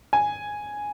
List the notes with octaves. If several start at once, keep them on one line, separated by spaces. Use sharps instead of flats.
G#5